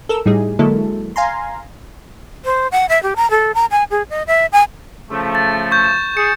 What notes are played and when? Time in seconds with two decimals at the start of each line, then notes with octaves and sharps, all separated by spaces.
0.09 A4 A#4 E6
0.26 A2 G3 D#4 G#4
0.59 D3 F#3 G#3 A#3 E4 A4
1.16 F5 G#5 A#5 C6
2.45 C5
2.72 F#5
2.89 E5
3.03 G4
3.16 A#5
3.31 A4
3.55 A#5
3.71 G#5
3.91 G#4
4.10 D#5
4.27 E5
4.52 G#5
5.11 C#3 F3 A3
5.35 A6
5.71 C#6 G6
5.84 E7
6.17 G#4 C#7